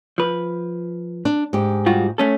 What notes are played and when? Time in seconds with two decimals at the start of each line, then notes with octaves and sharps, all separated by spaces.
0.18 F3 B4
1.25 D4
1.53 G#2 G4
1.86 G3 F4 F#4
2.18 A3 C#4 A4